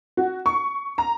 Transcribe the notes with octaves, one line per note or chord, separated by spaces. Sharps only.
F#4
C#6
A#5